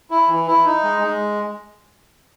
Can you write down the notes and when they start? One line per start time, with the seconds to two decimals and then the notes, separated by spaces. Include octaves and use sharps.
0.11 E4
0.28 E3
0.47 E4
0.65 D#4
0.83 G#3
1.01 G#3